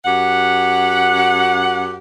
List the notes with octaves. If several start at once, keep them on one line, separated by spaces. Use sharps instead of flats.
F#2 G4 F#5